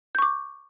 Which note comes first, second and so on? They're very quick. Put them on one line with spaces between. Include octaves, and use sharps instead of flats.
G6 C#6 D6